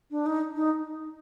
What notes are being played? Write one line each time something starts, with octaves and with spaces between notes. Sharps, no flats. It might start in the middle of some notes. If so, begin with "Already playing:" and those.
D4
D#4
D#4